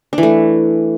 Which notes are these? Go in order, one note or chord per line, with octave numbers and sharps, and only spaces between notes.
D4
E3
A3